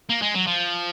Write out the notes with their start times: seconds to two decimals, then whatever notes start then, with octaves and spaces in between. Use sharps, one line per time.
0.09 A#3
0.22 G#3
0.35 F#3
0.47 F3